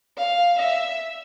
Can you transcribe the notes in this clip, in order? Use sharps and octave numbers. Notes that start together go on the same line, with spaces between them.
F5
E5